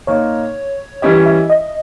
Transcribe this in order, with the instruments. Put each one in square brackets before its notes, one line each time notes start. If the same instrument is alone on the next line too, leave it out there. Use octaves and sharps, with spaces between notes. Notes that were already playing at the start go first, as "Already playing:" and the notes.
[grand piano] A#2 A#3 D#4 [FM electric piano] C#5
[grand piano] E3 G3 C#4 E4 G4 [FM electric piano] D#5
[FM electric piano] E5
D#5